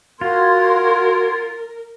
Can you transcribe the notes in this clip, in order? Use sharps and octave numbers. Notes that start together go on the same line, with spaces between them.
F4 F#4 A#4 C6 G#6